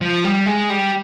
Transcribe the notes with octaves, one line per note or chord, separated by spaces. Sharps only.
F3
G3
G#3
G3